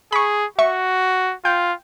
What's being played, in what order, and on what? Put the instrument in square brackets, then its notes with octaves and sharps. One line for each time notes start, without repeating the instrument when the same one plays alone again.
[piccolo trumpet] G#4 [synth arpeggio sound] B5 C#6
[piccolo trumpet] F#4 [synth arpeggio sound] E5 C#6
[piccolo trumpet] F4 [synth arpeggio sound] G5